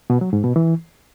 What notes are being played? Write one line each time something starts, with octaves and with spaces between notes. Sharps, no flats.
B2
F#3
G#2
B2
E3